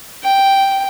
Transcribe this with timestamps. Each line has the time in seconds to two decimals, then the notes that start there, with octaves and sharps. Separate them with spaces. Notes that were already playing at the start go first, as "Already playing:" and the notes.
0.24 G5